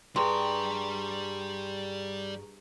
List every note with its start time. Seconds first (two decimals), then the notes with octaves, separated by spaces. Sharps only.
0.16 G2 G3 G#4 G5 A#5 C6 C#6